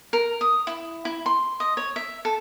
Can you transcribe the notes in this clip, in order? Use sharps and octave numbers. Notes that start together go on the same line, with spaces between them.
A#4
D#6
E4
E4
C6
D#5
C#5
E5
A4